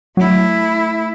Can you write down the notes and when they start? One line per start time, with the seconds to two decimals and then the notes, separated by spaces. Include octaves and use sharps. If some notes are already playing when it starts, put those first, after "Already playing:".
0.17 F#3 A3 E4